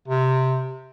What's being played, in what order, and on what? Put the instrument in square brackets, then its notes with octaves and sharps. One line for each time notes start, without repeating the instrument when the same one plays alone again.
[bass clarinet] C3